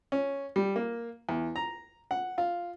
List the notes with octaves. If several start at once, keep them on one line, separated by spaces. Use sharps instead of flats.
C#4
G3
A#3
E2
A#5
F#5
F4